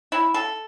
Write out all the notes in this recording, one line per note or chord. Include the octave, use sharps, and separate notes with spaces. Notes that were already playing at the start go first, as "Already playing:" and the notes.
E4
A4